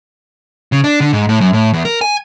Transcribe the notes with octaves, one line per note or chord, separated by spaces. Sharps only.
C#3
D4
D3
G#2
A2
F#2
A2
E2
A#4
G#5